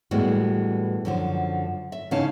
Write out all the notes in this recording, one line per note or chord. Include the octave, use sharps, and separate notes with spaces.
A2 E3 G3 G#3 B3 F#4
F#2 D3 F3
E5
C#3 E3 C#4 D#4 F5 A5